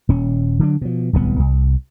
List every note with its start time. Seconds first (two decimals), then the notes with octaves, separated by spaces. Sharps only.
0.09 D#1 C#4
0.59 D3 F#3 D4
0.81 B2 F3
1.13 D1 C2 A#2 B3
1.39 C2